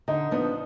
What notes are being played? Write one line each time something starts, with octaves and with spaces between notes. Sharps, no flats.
D3 D#4
F3 B3 D4